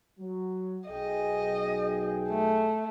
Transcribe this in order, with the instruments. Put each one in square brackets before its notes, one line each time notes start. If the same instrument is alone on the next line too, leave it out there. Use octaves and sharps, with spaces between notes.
[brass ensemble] F#3
[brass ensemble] B1 G#4 G5 [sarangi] D#5
[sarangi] A3